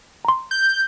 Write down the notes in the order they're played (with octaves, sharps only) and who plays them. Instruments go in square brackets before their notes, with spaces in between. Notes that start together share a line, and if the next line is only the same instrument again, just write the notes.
[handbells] A#5 C6
[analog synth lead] G6